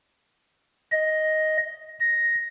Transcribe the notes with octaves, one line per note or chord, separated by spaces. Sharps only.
D#5
A#6